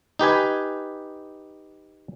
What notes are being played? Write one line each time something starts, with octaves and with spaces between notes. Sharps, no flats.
D#4 G4 B4 G#5